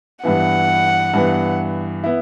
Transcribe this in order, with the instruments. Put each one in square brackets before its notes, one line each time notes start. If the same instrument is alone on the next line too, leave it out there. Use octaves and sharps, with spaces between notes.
[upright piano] G2 E3 B3 [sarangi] F#5
[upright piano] G2 E3 B3
B3 E4